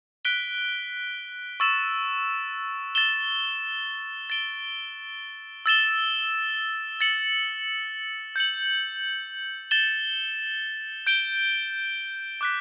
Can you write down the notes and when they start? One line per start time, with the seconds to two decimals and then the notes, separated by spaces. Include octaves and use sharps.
0.25 F#6 B6 D7 G7
1.60 C#6 E6 A6 E7
2.95 A6 E7 G7
4.30 A6 D7 G7
5.66 E6 A6 E7 G7
7.01 A6 C#7 F#7
8.36 G6 C#7 F#7
9.71 A6 E7 G7
11.07 G6 D7 G7
12.41 D6 F#6 B6